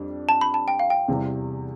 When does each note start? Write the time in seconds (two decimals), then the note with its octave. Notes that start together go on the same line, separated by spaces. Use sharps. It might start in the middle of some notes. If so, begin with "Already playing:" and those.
Already playing: F2 G3 D4
0.29 A5
0.41 B5
0.54 A5
0.68 G5
0.79 F5
0.90 G5
1.08 E2 C3 E3 G3